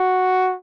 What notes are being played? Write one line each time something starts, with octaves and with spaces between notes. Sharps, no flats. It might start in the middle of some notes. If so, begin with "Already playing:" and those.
Already playing: F#4